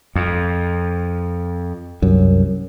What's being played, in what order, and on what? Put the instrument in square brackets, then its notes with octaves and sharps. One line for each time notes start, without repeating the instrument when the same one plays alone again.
[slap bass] F2
[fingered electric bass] C2 F#2